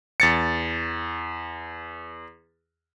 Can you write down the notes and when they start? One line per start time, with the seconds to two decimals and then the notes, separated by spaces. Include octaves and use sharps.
0.20 E2 A6 C#7